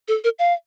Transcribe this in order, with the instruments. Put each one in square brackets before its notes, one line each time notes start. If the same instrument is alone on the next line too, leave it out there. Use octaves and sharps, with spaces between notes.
[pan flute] A4
A#4
F5